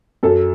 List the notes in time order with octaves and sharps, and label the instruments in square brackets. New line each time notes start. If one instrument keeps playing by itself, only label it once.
[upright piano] F#2 A4